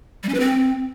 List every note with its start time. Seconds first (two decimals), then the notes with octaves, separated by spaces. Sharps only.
0.23 G3
0.29 C#4
0.34 B4
0.40 C4